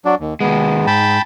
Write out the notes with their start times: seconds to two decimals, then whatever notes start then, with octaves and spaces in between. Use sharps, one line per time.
0.05 F#3 D4
0.20 D#2
0.41 D#2 G#3 B3
0.87 G#2 G5 A5 B5